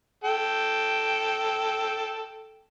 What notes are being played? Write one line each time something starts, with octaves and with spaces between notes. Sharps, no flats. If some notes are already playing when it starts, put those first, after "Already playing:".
A4 G5